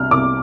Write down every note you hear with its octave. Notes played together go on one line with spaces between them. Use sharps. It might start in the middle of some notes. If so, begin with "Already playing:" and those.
Already playing: C2 F6
C2 D6